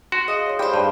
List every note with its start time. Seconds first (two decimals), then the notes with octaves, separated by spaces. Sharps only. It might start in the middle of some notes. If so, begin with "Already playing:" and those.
0.12 F#4 C6
0.28 G#4 D#5 F5 D#6
0.46 C#5 C6
0.59 G3 G#4 C5 G5
0.74 G2